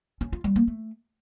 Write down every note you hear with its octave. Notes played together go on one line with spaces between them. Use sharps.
C#4
F4
G3
A#3
A3